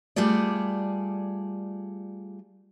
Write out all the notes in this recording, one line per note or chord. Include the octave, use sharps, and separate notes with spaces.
G3 A3 F4 G#4 D5